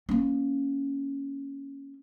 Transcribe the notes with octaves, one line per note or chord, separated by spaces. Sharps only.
A#3 C#4